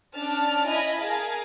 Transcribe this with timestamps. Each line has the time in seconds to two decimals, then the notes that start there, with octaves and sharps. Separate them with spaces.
0.16 C#4 D4 A5 F6
0.68 E4 D#5 G#5 B5
1.00 G#4 A#4 F5 G#5 A5